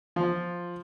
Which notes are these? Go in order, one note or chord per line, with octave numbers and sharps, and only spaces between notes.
F3 F4